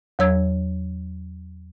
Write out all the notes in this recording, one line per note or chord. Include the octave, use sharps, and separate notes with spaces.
E2 F#3 C#5 E6 G#6